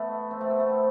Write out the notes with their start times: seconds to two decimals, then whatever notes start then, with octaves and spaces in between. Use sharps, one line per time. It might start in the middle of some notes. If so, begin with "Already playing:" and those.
Already playing: A3 B3
0.31 C4
0.41 A3
0.50 B3
0.60 A3
0.69 C4